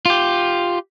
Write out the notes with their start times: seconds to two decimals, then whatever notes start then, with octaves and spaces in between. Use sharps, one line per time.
0.06 F4 G4